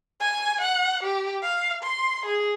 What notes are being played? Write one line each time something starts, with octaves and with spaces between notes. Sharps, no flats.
G#5
F#5
G4
F5
C6
G#4